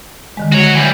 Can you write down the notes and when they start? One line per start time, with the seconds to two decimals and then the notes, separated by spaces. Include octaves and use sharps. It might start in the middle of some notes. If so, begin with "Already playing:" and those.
0.37 D3 D#3 G#3
0.52 F#4 C#5
0.75 E3 G3